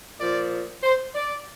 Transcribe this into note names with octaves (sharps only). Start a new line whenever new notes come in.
A#2 F3 D5
C5
D5